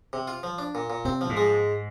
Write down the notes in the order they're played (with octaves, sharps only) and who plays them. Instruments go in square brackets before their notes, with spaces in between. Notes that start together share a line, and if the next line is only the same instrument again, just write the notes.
[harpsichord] C3
F4
F3
D4
A#2
A#2
[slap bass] C3 [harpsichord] C4
[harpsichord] F3
[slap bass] G#2
[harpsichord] G#3